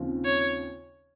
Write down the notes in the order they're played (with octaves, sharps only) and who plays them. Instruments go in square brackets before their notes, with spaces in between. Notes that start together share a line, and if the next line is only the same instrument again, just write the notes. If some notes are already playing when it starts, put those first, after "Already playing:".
Already playing: [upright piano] D#2 C#3 F3 C4 F4
[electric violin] C#5